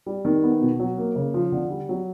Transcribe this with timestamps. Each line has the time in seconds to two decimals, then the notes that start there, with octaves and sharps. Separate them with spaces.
0.06 G3
0.25 D#3
0.43 B3
0.61 B2
0.79 F#3
0.98 A#3
1.16 C#3
1.34 F3
1.52 D3
1.71 G3
1.89 F#3